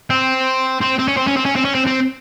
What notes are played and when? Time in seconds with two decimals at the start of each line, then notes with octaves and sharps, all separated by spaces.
0.10 C4
0.81 C4
0.98 C4
1.08 C#4
1.17 C4
1.27 C#4
1.37 C4
1.45 C#4
1.56 C4
1.65 C#4
1.74 C4
1.86 C4